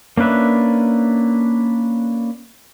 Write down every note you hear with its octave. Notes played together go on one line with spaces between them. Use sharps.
A#3 C#4 D4 B4 E5